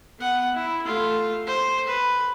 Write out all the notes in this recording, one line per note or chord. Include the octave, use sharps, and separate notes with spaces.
B3 F#5
E4
A3 F4
C5
B4